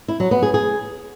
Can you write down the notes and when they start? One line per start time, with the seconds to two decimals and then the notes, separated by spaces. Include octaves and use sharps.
0.08 E4
0.20 F#3
0.31 B3
0.43 G#4
0.54 G#4